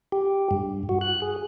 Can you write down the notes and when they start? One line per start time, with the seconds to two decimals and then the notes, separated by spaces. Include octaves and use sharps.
0.12 G4
0.51 G2
0.89 F#4
1.01 F#6
1.22 G#4